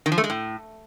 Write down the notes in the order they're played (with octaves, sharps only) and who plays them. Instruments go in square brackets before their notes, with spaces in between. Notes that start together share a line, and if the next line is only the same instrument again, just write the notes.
[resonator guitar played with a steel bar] D#3
F3
A3
G#3
A2